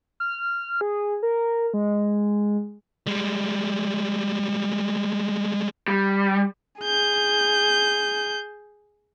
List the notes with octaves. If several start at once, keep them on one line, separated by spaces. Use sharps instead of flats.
F6
G#4
A#4
G#3
G3 G#3
G3
G#4 G6